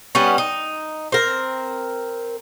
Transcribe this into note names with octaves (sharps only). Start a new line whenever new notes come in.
G3 B3 C#4
D#4
C4 A#4